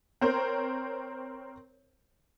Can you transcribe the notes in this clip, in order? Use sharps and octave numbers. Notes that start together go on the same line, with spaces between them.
C4 A#4 C5 C#5